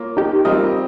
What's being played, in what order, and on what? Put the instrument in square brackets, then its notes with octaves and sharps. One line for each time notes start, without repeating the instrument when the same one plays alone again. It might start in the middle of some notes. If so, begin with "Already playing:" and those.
Already playing: [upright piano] A#3 F4 C#5
[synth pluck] D#4 G4
[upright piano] G3 C4 F4 A#4 D#5